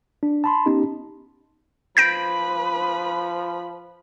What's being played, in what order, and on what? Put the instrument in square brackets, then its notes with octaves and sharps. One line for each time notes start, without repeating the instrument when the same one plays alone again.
[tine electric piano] D4
A5 B5 C6
B3 C#4 D#4 G4
[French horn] F3 [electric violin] B4 B5 [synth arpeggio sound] G6 A#6 D7